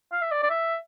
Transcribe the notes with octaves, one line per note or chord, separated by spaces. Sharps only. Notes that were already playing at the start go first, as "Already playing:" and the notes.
F5
E5
D5
D5
E5